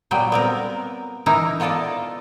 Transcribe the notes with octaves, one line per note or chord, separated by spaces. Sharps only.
A#2 F#3 G3 B3 G5
B3 C4 A#4
E3 D#4 E4 A#4
B3 F4 A4 D5 D#5 A5